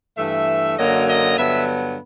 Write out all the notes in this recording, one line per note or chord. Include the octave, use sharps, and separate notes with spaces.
G2 E3 A3 E5
F#2 D3 F#3 A#3 D#5
D#5
G2 D3 F#3 B3 E5